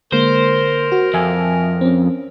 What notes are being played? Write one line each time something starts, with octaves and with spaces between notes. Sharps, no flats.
D3 G#3 A#3 A#4 C5
F#4
F2 E5 G#5
C4 C#4